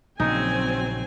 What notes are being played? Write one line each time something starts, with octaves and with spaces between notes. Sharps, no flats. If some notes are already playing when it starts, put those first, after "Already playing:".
A#1 C#3 F#3 C4 D#4 G#5